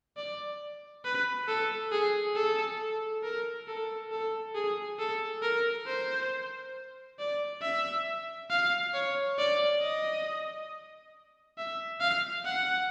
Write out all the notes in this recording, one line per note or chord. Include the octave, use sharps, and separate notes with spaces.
D5
B4
A4
G#4
A4
A#4
A4
A4
G#4
A4
A#4
C5
D5
E5
F5
C#5
D5
D#5
E5
F5
F#5